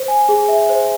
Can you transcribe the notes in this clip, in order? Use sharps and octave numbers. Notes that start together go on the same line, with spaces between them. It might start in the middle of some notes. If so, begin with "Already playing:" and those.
Already playing: C5
G#5
G#4
E5
C5